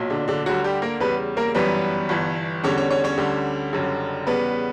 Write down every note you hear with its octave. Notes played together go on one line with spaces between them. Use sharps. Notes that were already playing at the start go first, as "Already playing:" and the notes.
Already playing: B1 A#2 F#3
D3 D4
D3 D4
D2 D3 F#3 G3 F#4
G3 G4
A#3 A#4
E2 C#3 G3 B3 B4
A#3 A#4
G1 F#2 E3 G3 B3 B4
G1 G2 E3
E2 D3 G3 C#4 C#5
C#4 C#5
C#4 C#5
C#4 C#5
D2 D3 G3
F#1 F#2 D3 G3
E2 C#3 G3 B3 B4